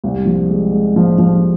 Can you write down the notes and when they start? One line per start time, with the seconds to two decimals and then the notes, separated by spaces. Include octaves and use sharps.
0.04 C2
0.25 F3
0.49 G#3
0.72 G#3
0.96 F3
1.18 F3